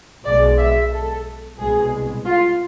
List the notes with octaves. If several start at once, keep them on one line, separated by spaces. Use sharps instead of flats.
B1 B2 G#3 D5
E5
A4
C2 B2 G#3 G#4
F4